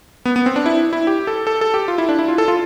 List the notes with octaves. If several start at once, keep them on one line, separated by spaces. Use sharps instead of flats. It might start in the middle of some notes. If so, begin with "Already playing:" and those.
B3
B3
C4
D4
E4
E4
G4
A4
A4
A4
G4
F4
E4
D4
E4
F4
A4
F4